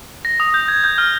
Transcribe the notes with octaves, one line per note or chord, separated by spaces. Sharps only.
A#6
D#6
G6
G#6
G6
F6